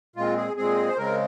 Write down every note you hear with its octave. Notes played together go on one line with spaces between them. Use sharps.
A#2 G#3 C4 F4
G#4
A#2 G#3 C4 G#4
C5
C#3 G#3 C4 A#4